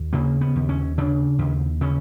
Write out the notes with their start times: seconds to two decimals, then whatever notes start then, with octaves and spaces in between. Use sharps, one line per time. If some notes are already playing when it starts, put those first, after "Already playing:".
Already playing: D#2
0.13 C#3 A#3
0.41 B3
0.56 D#2
0.69 C#4
0.98 C#3 D4
1.39 D#2
1.81 C#3 C#4